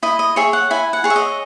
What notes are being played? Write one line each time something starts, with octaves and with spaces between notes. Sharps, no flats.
E4 D#5
D#5
G#4 C#5 E5
F#5
E4 G#5
F#5
G#4 C#5
E5
D#5